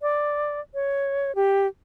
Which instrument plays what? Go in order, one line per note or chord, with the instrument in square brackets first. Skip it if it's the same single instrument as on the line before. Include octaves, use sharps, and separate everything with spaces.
[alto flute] D5
C#5
G4